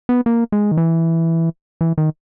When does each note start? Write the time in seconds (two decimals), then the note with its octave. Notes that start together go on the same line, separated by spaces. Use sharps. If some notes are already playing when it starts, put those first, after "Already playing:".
0.09 B3
0.26 A#3
0.52 G#3
0.72 D#3
0.77 E3
1.81 E3
1.98 D#3